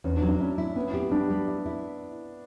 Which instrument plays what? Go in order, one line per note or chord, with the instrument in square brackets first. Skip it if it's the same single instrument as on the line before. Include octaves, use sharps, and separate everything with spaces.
[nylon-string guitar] E2 [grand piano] C#4
[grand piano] D4
[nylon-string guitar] F#3
[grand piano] D4
[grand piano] C#4 [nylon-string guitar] E4
[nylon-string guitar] E4
[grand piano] B3 [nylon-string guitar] C#4
[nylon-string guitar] G4
[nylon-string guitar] G3 [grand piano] D4
[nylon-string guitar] G3
E4
E4